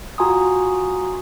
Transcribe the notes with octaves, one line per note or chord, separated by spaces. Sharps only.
F4 F#4 G#5 A#5 C6 D#6